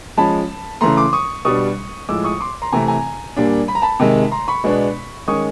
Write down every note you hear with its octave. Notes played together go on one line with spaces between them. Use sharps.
F3 G#3 C#4 A5 B5
C#3 E3 A3 A#5 C6
C6 D6
C#6 D#6
B2 G3 B3 D4 C#6 D#6
A2 F3 G#3 D6 E6
C#6 D#6
C6 D6
A#5 C6
C3 E3 A3 C4 G#5 A#5
G#5 A#5
A#2 G3 A#3 D4
B5
A#5
A5 B5
C3 D#3 G#3
A#5 C6
B5 C#6
B2 G#3 B3 D4
D#3 G#3 C#4 C#6 D#6